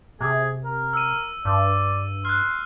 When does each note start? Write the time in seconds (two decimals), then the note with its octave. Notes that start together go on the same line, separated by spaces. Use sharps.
0.21 C3 G#4
0.64 A#4
0.93 E6 D#7
1.45 G2 D5
2.25 C6 F6 F#6